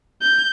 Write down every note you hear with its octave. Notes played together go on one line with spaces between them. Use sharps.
G6